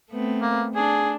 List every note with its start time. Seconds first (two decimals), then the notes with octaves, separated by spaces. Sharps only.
0.11 A3 B3 C4
0.42 A#3
0.75 D4 G#4